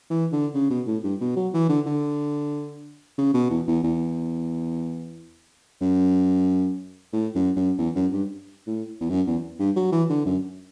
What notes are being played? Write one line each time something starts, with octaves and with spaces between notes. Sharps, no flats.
E3
D3
C#3
B2
A2
G2
B2
F#3
E3
D3
D3
C#3
B2
E2
E2
E2
F#2
A2
F#2
F#2
E2
F#2
G2
A2
E2
F#2
E2
G2
F#3
E3
D3
F#2